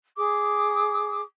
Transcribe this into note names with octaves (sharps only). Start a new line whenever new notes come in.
G#4 D6 D#6